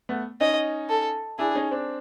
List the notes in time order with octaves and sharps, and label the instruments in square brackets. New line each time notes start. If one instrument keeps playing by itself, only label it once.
[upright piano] A3 B3
[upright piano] C#4 D#4 [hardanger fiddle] D#5
[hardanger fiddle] A4
[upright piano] D4 E4 [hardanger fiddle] G#4
[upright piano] C#4 D#4
C4 D4